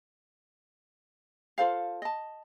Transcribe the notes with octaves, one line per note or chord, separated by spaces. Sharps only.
F4 A4 C5 F5
D#5 A5